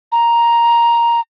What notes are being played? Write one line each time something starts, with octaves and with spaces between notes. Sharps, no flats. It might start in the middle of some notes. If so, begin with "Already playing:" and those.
A#5